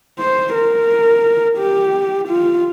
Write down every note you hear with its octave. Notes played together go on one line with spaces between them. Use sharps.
C5
A#4
G4
F4